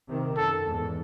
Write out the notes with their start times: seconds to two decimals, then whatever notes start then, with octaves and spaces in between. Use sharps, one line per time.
0.08 C3 D#3
0.37 F#2 A4
0.66 E2 G#2